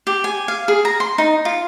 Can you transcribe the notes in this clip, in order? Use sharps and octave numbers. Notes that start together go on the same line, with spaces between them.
G4
G#5
F5
G#4
A#5
C6
D#4
F4